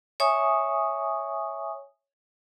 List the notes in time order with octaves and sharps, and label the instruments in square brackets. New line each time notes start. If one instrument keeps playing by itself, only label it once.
[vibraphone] C#5 E5 G#5 C#6 D#6